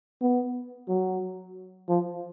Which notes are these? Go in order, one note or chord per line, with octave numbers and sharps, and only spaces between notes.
B3
F#3
F3